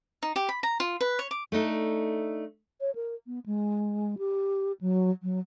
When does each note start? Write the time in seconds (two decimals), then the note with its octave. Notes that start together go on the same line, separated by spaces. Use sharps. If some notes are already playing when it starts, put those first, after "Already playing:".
0.23 D#4
0.36 G4
0.49 B5
0.63 A#5
0.80 F4
1.01 B4
1.19 C#5
1.31 D6
1.52 A3 D4 D#4 A4
2.81 C#5
2.95 A#4
3.27 B3
3.46 G#3
4.18 G4
4.81 F#3
5.23 F#3